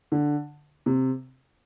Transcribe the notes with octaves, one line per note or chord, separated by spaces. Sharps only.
D3
C3